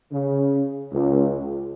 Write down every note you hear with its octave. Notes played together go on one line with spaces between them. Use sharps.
C#3
C#2